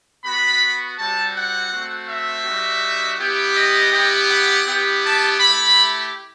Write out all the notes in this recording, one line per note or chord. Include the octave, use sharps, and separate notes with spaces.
B3 F#4 B5
G3 C4 F#4 A5
F#5
A3 C4 F#4
E5
G3 D#4 F#4
B3 E4 G4
D#5
B3 E4 G4
F#5
B3 E4 G4
A5
A3 E4 G4 B5